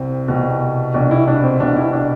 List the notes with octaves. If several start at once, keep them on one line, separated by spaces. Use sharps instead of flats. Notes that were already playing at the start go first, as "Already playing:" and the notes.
Already playing: C2 C4
C2 B2
C2 B2 D4
E4
D4
C4
C2 B2 D4
E4
D4